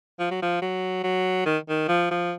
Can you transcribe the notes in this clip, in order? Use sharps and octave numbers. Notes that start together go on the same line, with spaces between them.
F3
F#3
F3
F#3
F#3
D#3
D#3
F3
F3